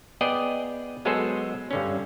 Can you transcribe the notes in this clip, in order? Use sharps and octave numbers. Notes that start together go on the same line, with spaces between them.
B3 G#4 D5 D#5 G5
F#3 G#3 B3 G#4 A4 C5
G2 D3 C#4